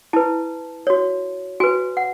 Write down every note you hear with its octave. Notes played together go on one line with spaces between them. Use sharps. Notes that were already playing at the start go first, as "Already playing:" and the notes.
E4 B4 A5
F#4 C#5
F#4 B4 G#5
F#5